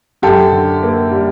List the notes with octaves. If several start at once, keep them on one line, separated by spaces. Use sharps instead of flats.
F#2 G4 A4
D3
A#3
G3